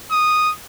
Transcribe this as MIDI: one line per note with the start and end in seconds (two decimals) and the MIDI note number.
0.12 0.52 87